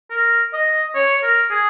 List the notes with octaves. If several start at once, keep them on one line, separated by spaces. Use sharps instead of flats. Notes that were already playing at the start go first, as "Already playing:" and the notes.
A#4
D#5
C#5
A#4
G#4